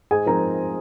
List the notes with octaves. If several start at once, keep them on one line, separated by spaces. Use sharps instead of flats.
G#2 G#4 G#5
F3 G#3 C4 D#4 A#4 A#5